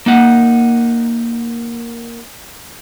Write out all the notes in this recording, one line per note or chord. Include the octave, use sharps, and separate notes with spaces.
A#3 D#4 F#5